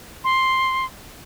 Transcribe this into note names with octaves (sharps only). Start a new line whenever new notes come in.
C6